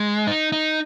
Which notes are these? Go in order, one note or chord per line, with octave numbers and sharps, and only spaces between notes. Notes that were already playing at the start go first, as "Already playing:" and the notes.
Already playing: G#3
D#4
D#4